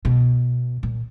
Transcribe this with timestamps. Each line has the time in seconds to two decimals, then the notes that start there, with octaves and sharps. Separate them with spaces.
0.05 B2
0.83 A#2